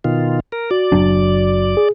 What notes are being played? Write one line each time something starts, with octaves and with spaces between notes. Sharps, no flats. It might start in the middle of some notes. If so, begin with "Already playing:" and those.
B2 D#3 F4
A#4
F#4 D5
F#1 F#3 D4
G#4